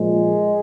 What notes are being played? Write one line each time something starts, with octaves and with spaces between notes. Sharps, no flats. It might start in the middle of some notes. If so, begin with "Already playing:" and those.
Already playing: A#2 F3 G#3